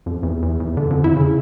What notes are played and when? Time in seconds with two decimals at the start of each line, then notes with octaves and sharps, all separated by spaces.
0.06 F2
0.23 E2
0.42 E2
0.60 E2
0.77 D3
0.90 F2
1.04 E4
1.17 C#3